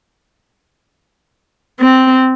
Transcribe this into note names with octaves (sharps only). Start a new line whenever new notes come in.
C4